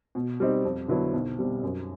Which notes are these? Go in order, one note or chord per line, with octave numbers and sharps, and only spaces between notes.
B2
G3 C4 D#4
F2
D3 F#3 B3 E4
B1
B2 G3 C4
F#2